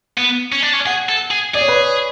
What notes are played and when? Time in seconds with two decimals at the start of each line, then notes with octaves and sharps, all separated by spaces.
0.17 B3
0.52 C#4
0.62 D4
0.73 C#4
0.86 G#4 F#5
1.09 A4
1.31 G#4
1.54 G#4 D5
1.61 C#5
1.68 B4
1.76 C#5